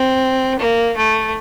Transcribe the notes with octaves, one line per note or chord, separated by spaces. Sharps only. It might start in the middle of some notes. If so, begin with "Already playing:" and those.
Already playing: C4
A#3
A3